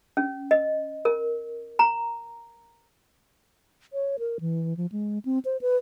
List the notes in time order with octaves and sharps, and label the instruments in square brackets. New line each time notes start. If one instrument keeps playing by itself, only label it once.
[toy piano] C#4
D#5
A#4
A#5
[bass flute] C#5
A#4
E3
F3
G#3
C4
C5
B4